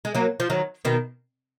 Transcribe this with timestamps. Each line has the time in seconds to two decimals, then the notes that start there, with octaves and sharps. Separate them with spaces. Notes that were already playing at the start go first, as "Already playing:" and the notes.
0.05 G#3
0.15 F#3 A#3
0.40 F3
0.50 D#3 F#3
0.85 B2 D#3